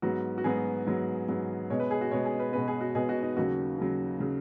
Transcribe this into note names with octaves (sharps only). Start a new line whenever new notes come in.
G#2 F#3 B3 F#4
F#4
G#2 F#3 B3 G#4
G#2 F#3 B3
G#2 F#3 B3
B2 G#3 B3 C#5
B4
G#4
F#4
B2 G#3 B3 C#5
G#4
B4
B2 G#3 B3 B4
G#4
F#4
B2 G#3 B3 G#4
F#4
D#4
D#2 C#3 F#3 F#4
D#2 C#3 F#3
C#3 F#3